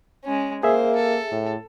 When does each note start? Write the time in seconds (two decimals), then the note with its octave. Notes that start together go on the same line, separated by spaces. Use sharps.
0.24 G#3 C#4
0.63 A#3 G#4 C5 E5
0.96 A4
1.31 A2